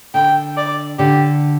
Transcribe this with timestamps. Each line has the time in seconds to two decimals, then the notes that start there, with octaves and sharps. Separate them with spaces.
0.14 D3 G5
0.57 D5
0.99 D3 G4